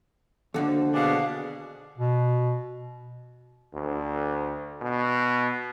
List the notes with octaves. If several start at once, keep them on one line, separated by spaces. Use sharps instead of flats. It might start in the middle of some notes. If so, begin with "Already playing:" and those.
D#2 D3 F3 F#4 A4
B2 D4 G#4 F5
B2
D2
B2